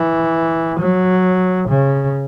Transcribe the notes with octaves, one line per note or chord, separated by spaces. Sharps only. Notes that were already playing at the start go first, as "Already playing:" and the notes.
Already playing: E3
F#3
C#3